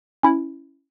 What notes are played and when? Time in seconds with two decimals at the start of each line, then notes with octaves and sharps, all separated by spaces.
0.23 C#4 E4